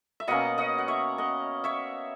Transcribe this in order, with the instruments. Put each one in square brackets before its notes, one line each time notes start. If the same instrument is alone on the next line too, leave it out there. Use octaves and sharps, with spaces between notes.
[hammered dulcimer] E5
B2 A#3 C#4 D#5 F#5
D#5 F#5
F#5
C#5 E5
D#5 F#5
C#5 E5